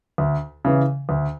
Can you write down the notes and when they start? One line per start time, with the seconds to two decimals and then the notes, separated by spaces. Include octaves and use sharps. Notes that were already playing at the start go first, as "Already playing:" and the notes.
0.18 D2
0.65 C#3 E3
1.09 D2